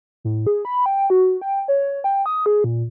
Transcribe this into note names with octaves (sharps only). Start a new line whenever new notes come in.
A2
G#4
B5
G5
F#4
G5
C#5
G5
D#6
G#4
A#2